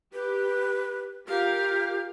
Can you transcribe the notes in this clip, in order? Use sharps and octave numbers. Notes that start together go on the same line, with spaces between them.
G4 B4
F4 G4 A#4 F5